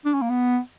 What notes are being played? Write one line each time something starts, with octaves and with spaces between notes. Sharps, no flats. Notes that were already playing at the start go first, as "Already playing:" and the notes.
D4
C#4
A#3
B3